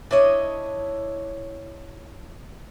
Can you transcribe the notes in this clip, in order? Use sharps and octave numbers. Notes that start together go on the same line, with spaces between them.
D4 E4 C#5 D#5